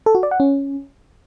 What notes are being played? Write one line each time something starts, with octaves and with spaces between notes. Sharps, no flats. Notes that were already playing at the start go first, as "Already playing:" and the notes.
A4
F#4
D5
F#5
C#4